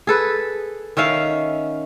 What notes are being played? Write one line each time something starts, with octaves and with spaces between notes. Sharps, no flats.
G#4 A4 B4
D#3 C#4 E5 F5